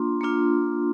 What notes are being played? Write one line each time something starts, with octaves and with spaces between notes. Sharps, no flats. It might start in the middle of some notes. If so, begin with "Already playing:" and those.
Already playing: A#3 D4 F4 C6
A#3 D4 F4